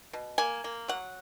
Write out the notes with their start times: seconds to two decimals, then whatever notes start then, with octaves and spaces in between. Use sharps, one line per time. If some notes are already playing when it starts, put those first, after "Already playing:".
0.13 B2
0.38 A#3 G#5
0.64 A#3
0.88 F#3 F#5